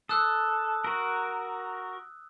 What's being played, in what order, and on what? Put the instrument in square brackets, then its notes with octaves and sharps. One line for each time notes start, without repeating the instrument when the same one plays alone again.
[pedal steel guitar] A4 [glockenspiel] D#6 E6 F#6
[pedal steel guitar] F#4 A#4